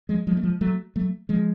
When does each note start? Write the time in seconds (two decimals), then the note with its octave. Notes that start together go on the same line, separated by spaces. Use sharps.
0.09 F3 G#3
0.27 F3 G#3
0.37 A3
0.44 F3 G#3
0.61 F#3 A3
0.96 F#3 A3
1.29 F3 G#3